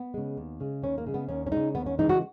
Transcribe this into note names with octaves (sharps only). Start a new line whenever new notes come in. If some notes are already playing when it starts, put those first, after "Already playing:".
Already playing: B3
C#3 G#3
D#2
C#3 G#3
D#2 C#4
A#3
C#3 G#3
B3
D#2 C#4
C#4
C#3 G#3 D#4
D#2 B3
C#4
C#3 E3 G#3 D#4
F#4